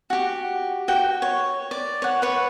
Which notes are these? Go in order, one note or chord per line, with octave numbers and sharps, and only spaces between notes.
F#4 G4
F#4 G5
C#5
D5
C#5 F#5
B4 C#5